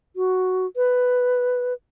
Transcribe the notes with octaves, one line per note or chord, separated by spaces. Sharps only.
F#4
B4